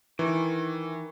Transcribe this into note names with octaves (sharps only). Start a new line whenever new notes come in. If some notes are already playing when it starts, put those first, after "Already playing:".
D#3 E3